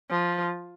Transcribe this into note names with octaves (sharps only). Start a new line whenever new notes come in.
F3